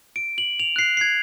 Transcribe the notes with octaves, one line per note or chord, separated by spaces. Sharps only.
D7
F#7
F7
F#6 C7
G#6 C7